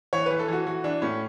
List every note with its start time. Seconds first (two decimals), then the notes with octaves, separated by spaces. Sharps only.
0.13 E3 C#5
0.26 E3 B4
0.39 A4
0.48 E3 F#4
0.66 E3 F#4
0.84 E3 D4
1.02 A2 C#4